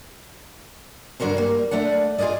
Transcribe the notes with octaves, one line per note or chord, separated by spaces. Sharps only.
G2 D3 D4 F#4 A#4 C5
G3 A#3
A3 D4 D5 F#5
F4 G#4 A#4 D5 D#5